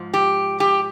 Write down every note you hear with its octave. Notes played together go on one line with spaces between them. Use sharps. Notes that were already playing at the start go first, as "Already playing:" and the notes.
Already playing: G#2 F3
G4
G4